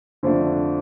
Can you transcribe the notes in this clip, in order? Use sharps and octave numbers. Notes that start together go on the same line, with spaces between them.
F2 D3 F3 A3 D4